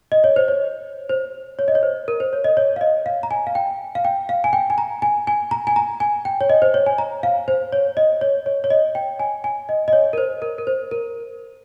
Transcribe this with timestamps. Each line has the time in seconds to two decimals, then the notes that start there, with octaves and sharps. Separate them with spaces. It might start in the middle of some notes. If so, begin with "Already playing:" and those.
0.12 D#5
0.24 C#5
0.36 C5
0.48 C#5
1.09 C5
1.59 C#5
1.68 D#5
1.75 C#5
1.83 C5
2.08 A#4
2.20 C5
2.33 C#5
2.44 D#5
2.57 C#5
2.76 F5
2.81 D#5
3.06 F5
3.23 A#5
3.31 G#5
3.47 F5
3.55 G5
3.95 F5
4.05 G5
4.29 F5
4.44 G#5
4.53 G5
4.70 G#5
4.78 A#5
5.02 G#5
5.27 G#5
5.51 A#5
5.67 G#5
5.76 A#5
6.00 G#5
6.25 G5
6.41 C#5
6.50 D#5
6.62 C5
6.74 C#5
6.86 G#5
6.98 A#5
7.23 F5
7.48 C5
7.73 C#5
7.97 D#5
8.21 C#5
8.46 C#5
8.64 C#5
8.70 D#5
8.95 G5
9.19 G#5
9.44 G#5
9.69 D#5
9.88 D#5
9.93 C#5
10.13 A#4
10.18 C5
10.42 A#4
10.58 A#4
10.67 C5
10.91 A#4